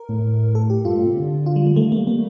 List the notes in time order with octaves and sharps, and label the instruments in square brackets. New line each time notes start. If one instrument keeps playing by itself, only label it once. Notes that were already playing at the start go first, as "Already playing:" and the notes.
Already playing: [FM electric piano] A#4
[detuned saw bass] A2
[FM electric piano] A4
G4
[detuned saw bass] G2 [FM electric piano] F4
[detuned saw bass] A2
C3
D3
[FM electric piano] F4
G3
G3
[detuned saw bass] D#3 [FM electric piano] A3
[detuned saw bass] D#3
[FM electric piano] A#3
[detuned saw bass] G3
[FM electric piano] A#3